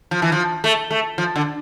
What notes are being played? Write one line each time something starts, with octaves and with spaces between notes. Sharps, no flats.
F3
E3
F3
A3
A3
F3
D3